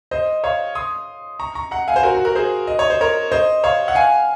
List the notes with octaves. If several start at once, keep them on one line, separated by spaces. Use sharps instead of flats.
C5 D#5
C#5 F5
C6 D#6
A#5 C#6
A#5 C#6
F#5 A#5
F5 G#5
C5
F#4 A#4
F#4
F#4 A#4
G#4 C5
D#5
C#5
C5
A#4 C#5
C5 D#5
C#5 F5
F#5
F5 G#5